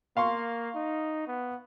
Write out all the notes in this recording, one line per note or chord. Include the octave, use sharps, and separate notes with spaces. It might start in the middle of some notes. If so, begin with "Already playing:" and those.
A#3 F5 C6 C#6
D#4
B3